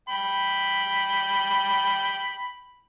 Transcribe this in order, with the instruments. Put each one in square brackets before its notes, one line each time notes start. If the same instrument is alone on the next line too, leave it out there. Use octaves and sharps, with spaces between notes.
[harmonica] G5 B5